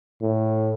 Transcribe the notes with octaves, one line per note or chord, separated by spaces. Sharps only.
A2